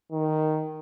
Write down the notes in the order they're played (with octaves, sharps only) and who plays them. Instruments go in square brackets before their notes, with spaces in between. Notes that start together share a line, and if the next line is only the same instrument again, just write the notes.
[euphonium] D#3